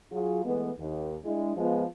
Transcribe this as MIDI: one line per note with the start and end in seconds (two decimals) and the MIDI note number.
0.12 0.44 54
0.12 0.44 65
0.12 0.44 68
0.45 0.70 52
0.45 0.70 56
0.45 0.70 57
0.45 0.70 59
0.78 1.15 39
1.25 1.53 56
1.25 1.53 62
1.25 1.53 64
1.57 1.83 53
1.57 1.83 56
1.57 1.83 59
1.57 1.83 65